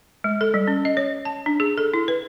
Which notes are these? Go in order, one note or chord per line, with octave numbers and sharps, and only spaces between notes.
G#3
A4
G3
C#4
D#5
C#5
A5
D4
G#4
A4
E4
B4